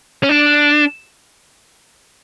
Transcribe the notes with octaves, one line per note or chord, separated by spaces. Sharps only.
C#4
D4